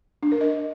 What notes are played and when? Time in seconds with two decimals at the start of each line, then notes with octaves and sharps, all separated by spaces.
0.23 D4
0.32 A#4
0.41 D#5